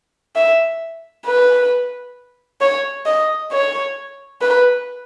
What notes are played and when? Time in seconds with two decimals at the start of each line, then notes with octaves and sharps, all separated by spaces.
0.35 E5
1.26 B4
2.61 C#5
3.06 D#5
3.52 C#5
4.42 B4